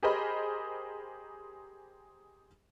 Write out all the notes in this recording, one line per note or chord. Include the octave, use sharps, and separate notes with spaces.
G4 G#4 A#4 C5 D#5 B5